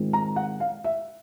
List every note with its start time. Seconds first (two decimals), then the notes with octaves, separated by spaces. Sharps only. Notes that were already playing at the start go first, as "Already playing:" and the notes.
Already playing: G#2 D#3 G#3 C4 F4
0.13 A#5
0.36 F#5
0.60 F5
0.84 E5